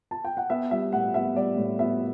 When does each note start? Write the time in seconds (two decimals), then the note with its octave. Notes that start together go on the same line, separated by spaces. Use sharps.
0.11 A5
0.25 G5
0.37 F#5
0.50 B3 E5
0.71 G3 E5
0.93 A2 F#5
1.14 B3 E5
1.36 G3 D5
1.57 A2
1.79 B3 E5